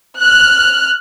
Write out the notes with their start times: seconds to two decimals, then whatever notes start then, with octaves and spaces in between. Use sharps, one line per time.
0.18 F6 F#6